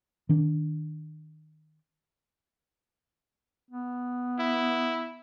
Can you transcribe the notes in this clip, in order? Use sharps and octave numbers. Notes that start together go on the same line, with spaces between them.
D#3 D4
B3
E4